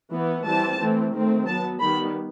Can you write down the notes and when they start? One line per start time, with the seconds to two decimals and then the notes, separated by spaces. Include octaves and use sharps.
0.12 E3 B3
0.46 E3 G3 C4 A5
0.79 E3 A3 C4
1.13 D#3 A3 C4
1.47 F#3 B3 A5
1.80 D#3 G3 B3 B5